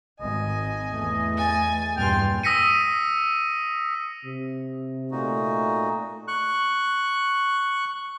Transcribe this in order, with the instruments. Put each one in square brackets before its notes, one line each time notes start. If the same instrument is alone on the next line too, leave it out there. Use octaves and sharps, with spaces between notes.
[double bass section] G#1 [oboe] D#5 [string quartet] G#5
[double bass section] E2 A3
[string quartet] G#5 A6
[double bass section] E2 G2 A#2 [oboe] G5 [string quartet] C6 F6 A6
[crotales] D#6 E6 A#6 B6 C#7 D#7
[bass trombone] C3
[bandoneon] A#2 D#4 F#4 [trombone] A3
[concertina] C#6 F#6